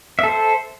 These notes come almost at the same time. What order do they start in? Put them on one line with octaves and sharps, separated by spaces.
E5 A4 C5